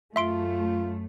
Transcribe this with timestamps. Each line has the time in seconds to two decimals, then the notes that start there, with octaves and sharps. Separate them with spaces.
0.16 F#2 A3 F4 E5 C6 D7